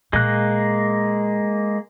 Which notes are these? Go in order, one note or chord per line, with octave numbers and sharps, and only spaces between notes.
A#2 G#3 A#3 F#6